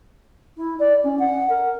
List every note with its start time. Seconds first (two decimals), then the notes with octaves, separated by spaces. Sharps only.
0.56 E4
0.79 D5
1.03 C#4
1.18 F#5
1.49 A#4